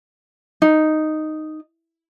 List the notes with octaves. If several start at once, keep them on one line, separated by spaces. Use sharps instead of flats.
D#4